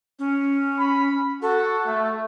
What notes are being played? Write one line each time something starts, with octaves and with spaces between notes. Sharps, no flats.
C#4
B5
F#4 A4
A3